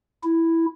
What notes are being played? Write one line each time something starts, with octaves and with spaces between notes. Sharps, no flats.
E4